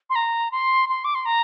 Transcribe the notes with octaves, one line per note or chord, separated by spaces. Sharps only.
C6
A#5
C6
C6
D6
C6
A#5